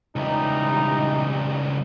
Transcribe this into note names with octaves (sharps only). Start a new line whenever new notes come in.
C#2 E3 G3 D#4